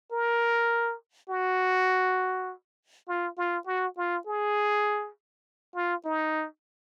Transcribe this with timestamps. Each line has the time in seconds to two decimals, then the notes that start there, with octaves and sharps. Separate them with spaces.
0.12 A#4
1.29 F#4
3.08 F4
3.38 F4
3.67 F#4
3.97 F4
4.27 G#4
5.75 F4
6.04 D#4